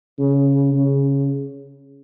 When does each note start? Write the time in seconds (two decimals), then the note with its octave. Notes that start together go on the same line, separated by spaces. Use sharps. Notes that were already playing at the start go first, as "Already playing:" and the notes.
0.19 C#3
0.73 C#3